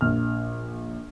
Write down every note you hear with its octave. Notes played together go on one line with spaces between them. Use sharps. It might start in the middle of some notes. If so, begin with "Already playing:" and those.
A#1 F6